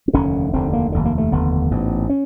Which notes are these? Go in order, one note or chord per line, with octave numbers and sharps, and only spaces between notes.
C4
F1 D#2 D3 C#4
F1 D#2 D3 C4
A#3
F1 D#2 D3
A#3
A3
F1 D#2 D3 B3
A1 G#2
C#4